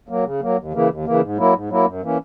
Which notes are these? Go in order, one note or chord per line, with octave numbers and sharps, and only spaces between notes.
F#3 A#3
C#3
F#3 A#3
D#2
C#3 E3 A#3
D#2
C#3 E3 A#3
G#2
F#3 A#3 E4
G#2
F#3 A#3 E4
F#2
E3 A#3 C#4